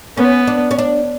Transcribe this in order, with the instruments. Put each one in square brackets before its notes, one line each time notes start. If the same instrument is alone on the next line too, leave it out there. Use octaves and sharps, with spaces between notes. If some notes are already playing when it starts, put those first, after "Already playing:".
[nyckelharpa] B3 [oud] C#4
[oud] D4
C#4
D4